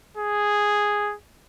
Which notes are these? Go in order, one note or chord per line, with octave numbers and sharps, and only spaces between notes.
G#4